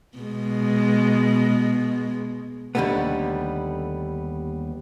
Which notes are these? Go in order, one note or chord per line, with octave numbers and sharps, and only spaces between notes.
B2 G#3
D#2 D3 F#3 G3 A3 B3